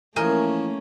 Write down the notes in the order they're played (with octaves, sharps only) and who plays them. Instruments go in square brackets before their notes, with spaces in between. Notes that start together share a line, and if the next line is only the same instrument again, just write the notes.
[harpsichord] E3 F3 [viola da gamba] A3 A#3 C#4 [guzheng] A#4 D#5 G#5